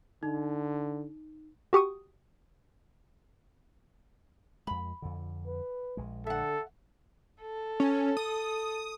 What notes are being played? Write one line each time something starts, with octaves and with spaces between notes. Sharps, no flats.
D3 D#4
F#4 G4 C#6 D#6
F2 G#3 B5
F2 D3
B4
A#1 G#3
D3 A4 E5 F#5
A4
C#4
D#6